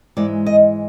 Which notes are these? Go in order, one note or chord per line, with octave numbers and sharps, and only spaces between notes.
G#2 E3 G#3 D5
D#5